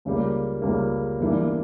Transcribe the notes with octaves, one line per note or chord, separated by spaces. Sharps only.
C#2 C#3 G3 A#3
C#2 C#3 G3 A#3
G1 G2 E3 A#3 D4